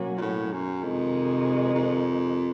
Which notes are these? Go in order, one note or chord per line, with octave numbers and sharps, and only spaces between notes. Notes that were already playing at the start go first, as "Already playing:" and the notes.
Already playing: B2 F#3 A#3 C#4 F#4
A#2
A2
F#2
F2 C3 D#3 G#3
F2